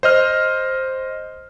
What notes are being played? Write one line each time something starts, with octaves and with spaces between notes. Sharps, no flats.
C5 D#5 F6